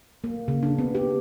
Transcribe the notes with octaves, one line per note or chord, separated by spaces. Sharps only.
A#3
C#3
D4
B3
G4